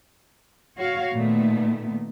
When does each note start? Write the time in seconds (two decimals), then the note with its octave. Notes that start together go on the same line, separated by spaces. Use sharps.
0.77 F#4 C#5 F5
1.14 A#2 D#3 A3 B3